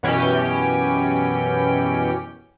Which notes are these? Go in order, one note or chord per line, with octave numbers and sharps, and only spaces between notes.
F#2 B2 E3 C#4 G4 G5